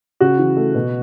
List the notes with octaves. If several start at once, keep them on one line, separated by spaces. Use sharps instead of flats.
C#3 F#4
E3
A3
B2